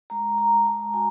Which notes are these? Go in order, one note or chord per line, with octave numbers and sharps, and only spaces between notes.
G#3 A#5
A#5
G#3
A5
F#4 G#5